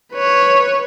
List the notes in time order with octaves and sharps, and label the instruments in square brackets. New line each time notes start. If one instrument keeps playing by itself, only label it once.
[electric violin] B4 C#5